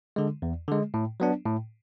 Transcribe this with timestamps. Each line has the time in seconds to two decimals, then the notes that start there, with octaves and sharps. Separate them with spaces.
0.16 D3 G#3
0.42 E2
0.68 D3 G#3
0.94 A2
1.20 F#3 B3 D4
1.46 A2